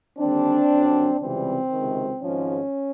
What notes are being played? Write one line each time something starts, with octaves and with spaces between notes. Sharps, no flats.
D#2 D3 G3 C4 D4
G1 F#2 D3 F#3
C#2 C3 E3 G3 C4
C#2 C3 D#3
G#1 G#2 F3 C#4